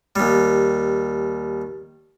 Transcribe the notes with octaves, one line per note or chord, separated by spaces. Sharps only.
D#2 G3